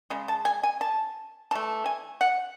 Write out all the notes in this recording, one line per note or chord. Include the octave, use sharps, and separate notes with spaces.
C#3 G#3
A5
G#5
G#5
A5
E3 A3 A5
G#5
F#5